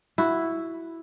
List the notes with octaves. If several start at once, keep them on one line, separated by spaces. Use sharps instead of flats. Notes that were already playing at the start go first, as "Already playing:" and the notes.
E4 F#4